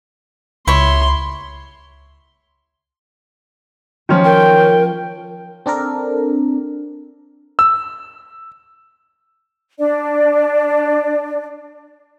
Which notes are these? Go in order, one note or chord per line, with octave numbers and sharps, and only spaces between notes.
C#2 E4 C#5 C6
D#3 F3 C#4 F4
A#4 G5
C4 D4 A4 A#4
E6
D4 D5